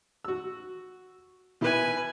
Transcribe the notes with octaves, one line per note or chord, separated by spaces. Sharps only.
F#4 E6
B2 E4 B4 G#5